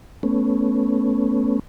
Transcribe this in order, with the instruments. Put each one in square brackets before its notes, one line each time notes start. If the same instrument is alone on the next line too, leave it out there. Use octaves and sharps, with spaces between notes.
[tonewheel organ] A3 B3 C#4